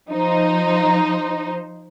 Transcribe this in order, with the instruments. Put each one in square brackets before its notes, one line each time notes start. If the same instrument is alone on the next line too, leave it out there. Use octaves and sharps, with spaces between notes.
[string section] F3 D#4 C5